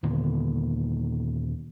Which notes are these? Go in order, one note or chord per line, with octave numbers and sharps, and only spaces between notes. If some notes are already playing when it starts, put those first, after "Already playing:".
D#2 A#2 D3 B3